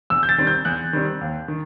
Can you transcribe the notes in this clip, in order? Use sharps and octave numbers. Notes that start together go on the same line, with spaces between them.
E2 E6
G6
A6
D#3 G3 C4
G6
E2 F#6
D#3 G3 C4
D#2
D#3